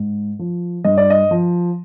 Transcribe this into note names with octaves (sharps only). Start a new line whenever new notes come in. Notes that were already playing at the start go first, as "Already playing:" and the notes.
Already playing: G#2
F3
G2 D#5
D5
D#5
F3